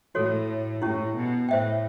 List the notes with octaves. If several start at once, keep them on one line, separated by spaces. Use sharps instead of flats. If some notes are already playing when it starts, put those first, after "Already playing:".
A2 F#4 A4 C#5
A2 C#4 E4 G4
B2
A2 C5 E5 G5